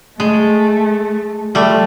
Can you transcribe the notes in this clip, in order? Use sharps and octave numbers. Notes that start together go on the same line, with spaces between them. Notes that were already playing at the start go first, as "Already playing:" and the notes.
G#3 A3
F3 G3 A3